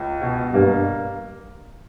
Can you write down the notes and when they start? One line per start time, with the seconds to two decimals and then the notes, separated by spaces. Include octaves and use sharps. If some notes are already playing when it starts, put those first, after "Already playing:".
Already playing: C#2
0.21 B2
0.53 G2 A#3